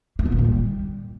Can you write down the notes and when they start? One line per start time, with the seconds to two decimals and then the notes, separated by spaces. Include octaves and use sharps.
0.19 A#3
0.26 E3
0.32 A#2
0.38 D#3
0.45 G3